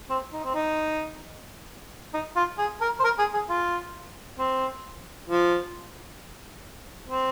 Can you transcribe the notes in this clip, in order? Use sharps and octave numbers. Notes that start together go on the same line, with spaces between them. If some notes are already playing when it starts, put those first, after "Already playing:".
C4
D#4
C4
D#4
D#4
F4
G#4
A#4
C5
A#4
G#4
G#4
F4
C4
F3
C4